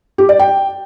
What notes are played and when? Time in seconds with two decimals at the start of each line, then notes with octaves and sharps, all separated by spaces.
0.18 G4
0.29 D5
0.39 G5